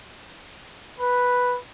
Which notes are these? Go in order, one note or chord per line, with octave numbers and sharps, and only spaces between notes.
B4